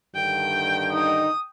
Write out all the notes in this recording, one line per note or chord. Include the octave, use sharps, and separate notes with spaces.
G2 D3 D#3 G5
D#4 D#6